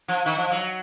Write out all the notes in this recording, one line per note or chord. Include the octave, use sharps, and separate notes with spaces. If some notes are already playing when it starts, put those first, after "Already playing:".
F3
D#3
F3
F#3